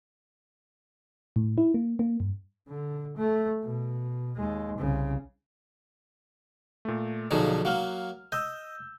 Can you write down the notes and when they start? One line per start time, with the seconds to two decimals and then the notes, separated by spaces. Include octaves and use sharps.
1.36 A2
1.58 E4
1.74 A#3
1.99 A#3
2.20 G2
2.68 D3
3.17 A3
3.64 B2
4.37 D#2 G#3
4.78 C2 C#3
6.85 A#2 A3
7.31 B1 D3 F3 F#3 D#4 G#4
7.65 F#3 A#3 F5 F#5 F6
8.32 D#5 E6 G6